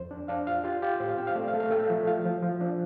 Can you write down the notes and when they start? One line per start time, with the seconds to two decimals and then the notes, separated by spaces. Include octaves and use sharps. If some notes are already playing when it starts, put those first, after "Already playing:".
Already playing: F2 C5
0.11 D4
0.28 D4 F5
0.47 F4 F5
0.64 F4 G4
0.82 F4 G4
1.00 A2 C5
1.09 F5
1.18 C4 G5
1.27 F5
1.35 A3 D5
1.48 F5
1.53 A3
1.60 F5
1.71 A3 G5
1.90 F3
2.07 F4 F5
2.25 F3
2.43 F3
2.61 D4